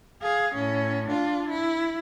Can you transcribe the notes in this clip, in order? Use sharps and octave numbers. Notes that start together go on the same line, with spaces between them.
G#4 F5
A2 C#4
D4 F4
E4